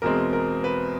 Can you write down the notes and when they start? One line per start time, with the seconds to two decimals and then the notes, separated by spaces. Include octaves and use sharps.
0.02 E2 B2 G#3 C4 A#4
0.33 A#4
0.64 B4